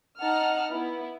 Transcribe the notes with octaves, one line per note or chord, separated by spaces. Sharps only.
D#4 F#5 A5 F6
B3 E4